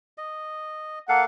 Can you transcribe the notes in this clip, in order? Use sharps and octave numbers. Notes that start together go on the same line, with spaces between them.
D#5
A#3 A4 F5 F#5